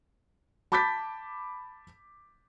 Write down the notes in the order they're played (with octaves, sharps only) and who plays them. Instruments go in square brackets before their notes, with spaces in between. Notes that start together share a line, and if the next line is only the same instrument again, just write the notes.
[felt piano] A5 B5 D6 G6 A6 B6